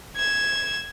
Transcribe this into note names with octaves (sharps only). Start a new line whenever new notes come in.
G#6 E7